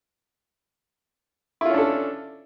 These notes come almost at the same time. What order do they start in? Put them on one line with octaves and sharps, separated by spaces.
E4 F4 C#4 D4 A4